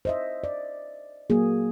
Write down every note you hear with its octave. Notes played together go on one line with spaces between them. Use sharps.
C5 D#5 E5
D5
F#3 A#3 F#4 G#4